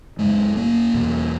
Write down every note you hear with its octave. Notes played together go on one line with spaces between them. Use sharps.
F#2 C#3 G#3
A#3
E2 B2